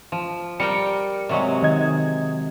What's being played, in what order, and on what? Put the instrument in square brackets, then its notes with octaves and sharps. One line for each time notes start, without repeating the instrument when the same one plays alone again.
[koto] F3
[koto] G3 A#4 G5 [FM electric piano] C#7
[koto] C3 F#3 G#3
[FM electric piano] D#3 D#5 G#6